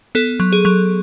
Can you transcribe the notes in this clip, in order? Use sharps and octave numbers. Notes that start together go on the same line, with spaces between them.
B3 A4
F#3
G#4
F#3